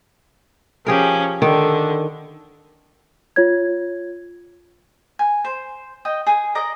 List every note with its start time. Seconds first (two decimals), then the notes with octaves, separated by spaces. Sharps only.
0.86 F3 C#4 G4 G#4 A#4
1.42 D3 D#3
3.36 F4 C#5 G#6
5.19 G#5
5.45 C5
6.05 D#5 G5
6.27 G#4 G#5
6.55 A#4 D5 D#5 A#5